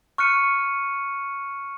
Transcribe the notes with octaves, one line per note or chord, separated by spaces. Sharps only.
C#6 F6 F#6 C#7 D#7